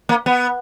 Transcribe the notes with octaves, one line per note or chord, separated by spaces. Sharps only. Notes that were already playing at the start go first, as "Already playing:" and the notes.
A#3
B3